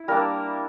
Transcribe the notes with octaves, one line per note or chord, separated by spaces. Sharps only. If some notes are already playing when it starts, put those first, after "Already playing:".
Already playing: E4
G3 A#3 D4 A#4